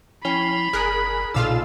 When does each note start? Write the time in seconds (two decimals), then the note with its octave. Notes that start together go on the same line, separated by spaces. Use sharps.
0.25 F3 C#4 E4 G5 B5
0.73 G1 G#4 A#4 F#6
1.34 B1 A#2 F4 F5 A5 E6